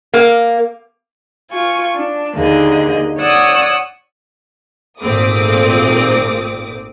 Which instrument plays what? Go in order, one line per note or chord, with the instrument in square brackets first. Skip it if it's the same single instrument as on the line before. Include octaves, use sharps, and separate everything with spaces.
[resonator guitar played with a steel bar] A#3
[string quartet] F4 G#5 C#6
D4
D#2 D3 A#3 G#4 D#5
C#5 D5 F#5 D#6 E6
[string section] G#1 A#2 A3 C4 D6 D#6